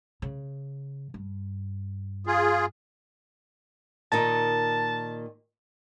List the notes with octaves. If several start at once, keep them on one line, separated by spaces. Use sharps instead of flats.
C#3
G2
F4 G#4
A#2 D#3 D#4 A5